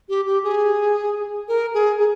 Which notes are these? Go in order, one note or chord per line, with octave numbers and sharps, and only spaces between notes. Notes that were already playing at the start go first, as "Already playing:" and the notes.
G4
G4
G#4
A#4
G#4
G#4